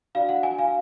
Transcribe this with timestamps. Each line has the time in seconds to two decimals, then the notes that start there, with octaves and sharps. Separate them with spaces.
0.15 D4 F#4 D5 F5
0.29 F#5
0.43 G#5
0.59 F5